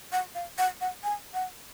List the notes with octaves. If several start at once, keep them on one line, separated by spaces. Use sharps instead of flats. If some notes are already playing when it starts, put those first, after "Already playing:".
F#5
F5
F#5
F#5
G#5
F#5